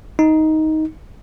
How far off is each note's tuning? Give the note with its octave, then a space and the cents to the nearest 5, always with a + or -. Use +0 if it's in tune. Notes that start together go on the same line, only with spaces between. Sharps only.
D#4 +10